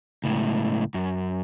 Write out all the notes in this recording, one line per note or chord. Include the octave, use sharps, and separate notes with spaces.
C#2 A2
F#2